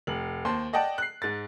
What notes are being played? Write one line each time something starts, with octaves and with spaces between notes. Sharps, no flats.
F1 F#7
D#2 C5 A5 C6
D5 D#5 F#5 G5 A5
F#6 C7
G#2 A6